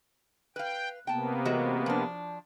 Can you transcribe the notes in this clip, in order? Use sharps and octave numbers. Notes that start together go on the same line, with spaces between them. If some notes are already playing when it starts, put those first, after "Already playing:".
B4 F5 G5
C3 A#3 B3 G5 A5
E3 G#3 F#4
F3 D4